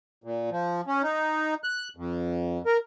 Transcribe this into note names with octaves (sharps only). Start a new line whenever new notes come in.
A#2
F3
C#4
D#4
F#6
F2
A#4